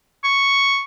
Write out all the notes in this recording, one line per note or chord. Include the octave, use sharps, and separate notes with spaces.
C#6